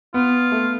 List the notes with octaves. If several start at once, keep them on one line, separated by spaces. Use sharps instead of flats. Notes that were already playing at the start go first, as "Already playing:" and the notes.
B3 F4
A3